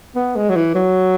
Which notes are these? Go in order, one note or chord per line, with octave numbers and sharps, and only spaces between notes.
B3
G#3
F#3
E3
F#3